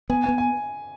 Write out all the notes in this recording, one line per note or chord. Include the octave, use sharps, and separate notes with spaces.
B3 G#5
B3 G#5
G#5